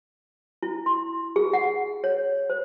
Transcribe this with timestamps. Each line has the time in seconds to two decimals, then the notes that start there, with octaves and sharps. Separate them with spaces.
0.63 E4
0.86 C6
1.36 G#4
1.53 F#5
2.04 C#5
2.50 C5